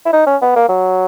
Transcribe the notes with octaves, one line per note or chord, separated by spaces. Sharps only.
E4
D#4
C#4
B3
A#3
F#3